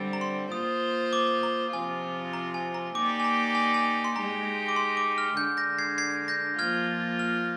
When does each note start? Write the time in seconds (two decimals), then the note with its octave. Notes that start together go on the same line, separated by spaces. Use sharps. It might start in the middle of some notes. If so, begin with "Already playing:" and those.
Already playing: D3 G3 C4
0.13 A#5
0.21 C6
0.51 A#3 F4 C5 D#6
1.13 D6
1.43 A#5
1.73 C3 F3 C4 F4 G#5
2.33 A#5
2.54 G#5
2.75 A#5
2.95 A#3 D#4 G4 D5 D6
3.20 G#5
3.24 A#5
3.55 G#5
3.74 G#5
4.04 C6
4.16 G#3 D#4 G4 A#5
4.69 D6
4.76 C6
4.97 D6
5.18 F6
5.37 D3 G#3 D4 G6
5.57 G6 A#6
5.78 G#6 C7
5.98 G#6 C7
6.28 G6 A#6
6.59 F3 A#3 F4 F6 G#6
7.19 F6